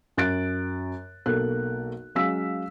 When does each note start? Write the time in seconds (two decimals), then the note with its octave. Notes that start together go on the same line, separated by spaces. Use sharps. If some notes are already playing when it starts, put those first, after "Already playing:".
0.17 F#2 F#6 A6 D7
1.26 B1 A#3 A4 A#4 F#6
2.15 F#3 G#3 C#4 F5 E6 B6